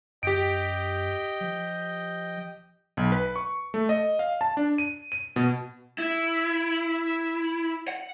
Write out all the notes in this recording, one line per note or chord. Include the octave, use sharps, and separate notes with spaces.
F#2 G4 D#5 G5 D7
F3
B1
B4
C#6
A3
D#5
F5
A5
D4
D#7
D#7
B2
E4
F#5